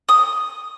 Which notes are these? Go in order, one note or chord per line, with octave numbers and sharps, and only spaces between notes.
D#6